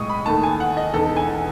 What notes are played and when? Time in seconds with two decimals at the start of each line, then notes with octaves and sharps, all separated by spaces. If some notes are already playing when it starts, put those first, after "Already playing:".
Already playing: B1 A2 G#3 C#6 D#6
0.10 B5
0.26 D#2 D#3 A3 A5
0.43 G#5
0.60 F#5
0.77 D#5
0.94 E1 E2 D#3 A4
1.17 G#5